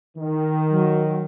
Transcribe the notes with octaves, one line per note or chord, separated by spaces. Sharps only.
D#3
F#3